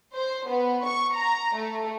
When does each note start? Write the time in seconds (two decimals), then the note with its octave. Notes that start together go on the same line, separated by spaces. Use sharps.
0.13 C5
0.47 B3
0.84 C#6
1.14 A#5
1.54 A3